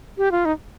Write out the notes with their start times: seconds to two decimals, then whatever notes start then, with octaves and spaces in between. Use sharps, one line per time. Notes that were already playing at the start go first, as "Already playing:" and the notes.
0.18 G4
0.32 F4
0.45 D#4